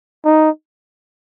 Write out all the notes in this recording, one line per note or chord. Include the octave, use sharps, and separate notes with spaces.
D#4